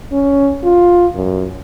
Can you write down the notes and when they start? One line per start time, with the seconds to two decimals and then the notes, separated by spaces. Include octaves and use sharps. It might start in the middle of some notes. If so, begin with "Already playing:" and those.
0.12 C#4
0.64 F4
1.15 F#2